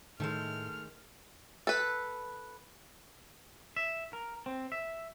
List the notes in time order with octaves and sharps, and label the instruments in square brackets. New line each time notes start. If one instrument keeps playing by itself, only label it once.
[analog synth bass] A2 [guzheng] D#3 G#3 [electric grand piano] A3 A4 A#4 [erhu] F6
[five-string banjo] A4 B4
[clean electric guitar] E5
A#4
C4
E5